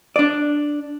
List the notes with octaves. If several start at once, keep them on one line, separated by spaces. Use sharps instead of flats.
D4 D5